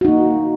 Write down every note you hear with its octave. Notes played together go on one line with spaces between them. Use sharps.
A#3 D#4 F#4